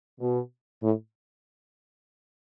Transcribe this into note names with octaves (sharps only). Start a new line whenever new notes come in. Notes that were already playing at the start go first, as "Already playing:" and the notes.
B2
A2